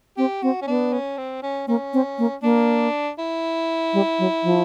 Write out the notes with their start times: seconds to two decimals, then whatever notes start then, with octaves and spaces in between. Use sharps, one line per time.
0.18 C4 G4
0.43 C4 F#4
0.62 C#4
0.67 B3 D4
0.93 C#4
1.18 C4
1.43 C#4
1.68 A#3 C#4
1.93 C4
2.18 A#3
2.43 A#3 D4
3.18 E4
3.93 G3
4.19 F#3
4.43 F3